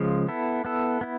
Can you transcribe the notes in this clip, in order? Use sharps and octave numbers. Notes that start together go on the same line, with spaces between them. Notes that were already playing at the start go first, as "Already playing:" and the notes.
Already playing: C#3 F3 G#3
B3 E4 A4
B3 E4 A4
B3 E4